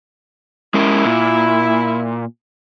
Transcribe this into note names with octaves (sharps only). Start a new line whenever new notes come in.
G#3 C#4 E4 A#4
A#2